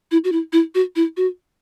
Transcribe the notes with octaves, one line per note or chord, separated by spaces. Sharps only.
E4
F#4
E4
E4
F#4
E4
F#4